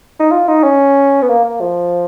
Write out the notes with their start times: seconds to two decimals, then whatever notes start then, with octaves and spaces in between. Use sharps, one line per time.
0.20 D#4
0.31 F4
0.48 D#4
0.63 C#4
1.22 B3
1.29 A#3
1.44 A#3
1.61 F3